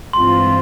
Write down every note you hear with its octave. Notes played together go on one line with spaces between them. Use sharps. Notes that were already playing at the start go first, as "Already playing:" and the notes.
G2 E3 G#3 C4 F4 C6